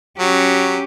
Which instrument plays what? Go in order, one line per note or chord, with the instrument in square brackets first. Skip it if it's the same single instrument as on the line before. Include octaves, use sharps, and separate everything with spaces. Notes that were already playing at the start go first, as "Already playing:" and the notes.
[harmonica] F#3 [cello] C#4 G4